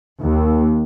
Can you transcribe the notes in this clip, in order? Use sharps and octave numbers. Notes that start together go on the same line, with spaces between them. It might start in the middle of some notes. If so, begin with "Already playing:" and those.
D#2